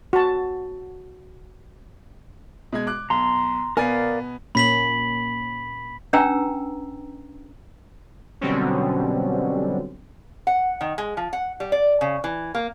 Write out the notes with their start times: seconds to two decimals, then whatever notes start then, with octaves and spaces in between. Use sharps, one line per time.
0.13 F#4 A5
2.73 B2 G#3 G#6
2.87 D6 F#6
3.10 B1 A#5 C6
3.77 B2 B3 A#4 D5 F5 G#5
4.55 A#2 A#3 C#4 B5 B6 F#7
6.13 C#4 D4 B4 G5 A#5 E6
8.41 B2 D3 F#3 G3 C4 C#4
10.47 F#5
10.81 D#3
10.98 G#3
11.17 F3
11.33 F#5
11.60 G3
11.72 D5
12.01 C#3
12.24 E3
12.55 A#3